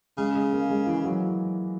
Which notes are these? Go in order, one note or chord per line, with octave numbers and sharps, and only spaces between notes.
C#3 G#3
G#3
A#3
G#3
E3
F#3